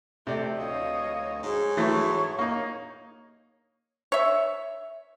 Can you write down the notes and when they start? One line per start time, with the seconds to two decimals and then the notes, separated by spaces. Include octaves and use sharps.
0.27 C3 A3 G4 D5
0.59 D2 C#5 D#5 F5
1.43 G#2 G#4 C#5
1.77 E3 F#3 A3 C#6
2.39 A#3 D#4
4.12 C#5 E5